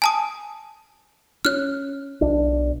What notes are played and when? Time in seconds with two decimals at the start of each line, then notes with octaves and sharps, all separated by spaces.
0.02 G#5 A5 D#6
1.45 C#4 F6 F#6
2.21 B1 D4